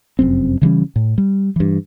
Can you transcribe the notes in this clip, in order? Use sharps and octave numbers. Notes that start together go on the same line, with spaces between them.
F1 F#2 C4
C#3 E3 G3 C#4
A2
G3
G2 E3